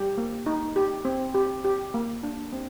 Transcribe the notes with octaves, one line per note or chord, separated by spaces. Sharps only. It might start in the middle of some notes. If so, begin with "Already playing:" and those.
Already playing: G3 G4 G5
A#3
D#4
G4
C4
G4
G4
A#3
D4
C4